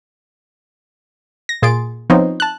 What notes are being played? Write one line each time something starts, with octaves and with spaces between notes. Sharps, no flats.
A#6
A#2 G#4 C6 A6 D7
F3 B3 C4 D#4 C5 C#5
A5 F#6